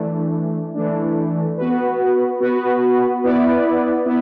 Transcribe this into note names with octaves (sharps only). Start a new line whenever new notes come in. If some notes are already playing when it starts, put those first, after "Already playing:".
Already playing: E3 A3 D4
E3 A3 D4
B3 F#4 B4
B3 F#4 B4
B3 E4 B4 D5
B3 E4